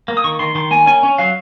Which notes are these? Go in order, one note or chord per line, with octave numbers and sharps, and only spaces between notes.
A#3
D#6
D#3 C#6
D#3 C6
D#3 C6
A#3 G#5
C#4 G#5
C#4
F#3 F5